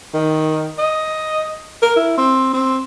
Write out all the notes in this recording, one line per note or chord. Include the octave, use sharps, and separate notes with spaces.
D#3
D#5
A#4
E4
C4
C4